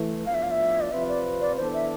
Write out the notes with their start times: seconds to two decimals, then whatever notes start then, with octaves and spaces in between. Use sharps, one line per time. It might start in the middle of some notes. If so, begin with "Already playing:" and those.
Already playing: E3 A3
0.26 A2 F3 B3 D4 F4 F5
0.34 E5
0.43 F5
0.51 E5
0.81 D5
0.92 C3 F3 C4 F4 B4 E5
1.08 D5
1.41 D5
1.57 E3 B3 D4 A4 C5
1.74 E5